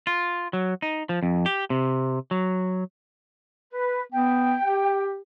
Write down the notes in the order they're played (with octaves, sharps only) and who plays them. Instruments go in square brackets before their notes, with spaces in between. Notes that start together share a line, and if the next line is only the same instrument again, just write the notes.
[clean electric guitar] F4
F#3
D#4
F3
F2
G4
C3
F#3
[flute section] B4
[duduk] B3 [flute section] G5
[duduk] G4